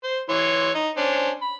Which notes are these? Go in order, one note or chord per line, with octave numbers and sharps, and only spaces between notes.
C5
E3 C#5 C6
D#4
C#4 D4 C5
B5